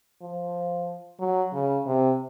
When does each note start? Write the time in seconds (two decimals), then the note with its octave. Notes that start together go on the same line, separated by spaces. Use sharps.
0.22 F3
1.20 F#3
1.53 C#3
1.86 C3